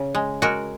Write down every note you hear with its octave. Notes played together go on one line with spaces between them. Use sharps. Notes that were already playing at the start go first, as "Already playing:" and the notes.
Already playing: C#3
G#3
G#3 F#4 A#4